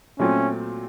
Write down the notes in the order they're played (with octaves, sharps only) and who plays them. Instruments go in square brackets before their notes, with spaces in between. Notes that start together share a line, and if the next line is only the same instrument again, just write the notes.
[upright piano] A#2 F#3 A3 C4 F4 [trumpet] C#4